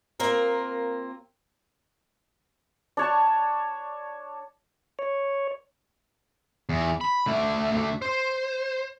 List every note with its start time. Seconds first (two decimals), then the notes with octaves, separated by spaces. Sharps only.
0.20 A#3 C4 F4 A#4
2.97 D4 C#5 A5
4.99 C#5
6.69 E2
7.01 B5
7.27 D3 A3
8.02 C5